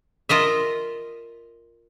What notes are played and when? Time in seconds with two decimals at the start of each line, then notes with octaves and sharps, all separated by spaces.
0.29 F4 A#4 D#5 E5